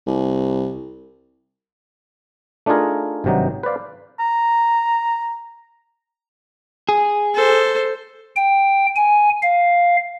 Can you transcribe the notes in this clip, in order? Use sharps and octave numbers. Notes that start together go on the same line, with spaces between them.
C2
A3 D4 D#4 F4 G#4 A#4
G#1 G2 C3 F#3 D#4
B4 C5 D5 F5
A#5
G#4
A4 C5
G5
G#5
F5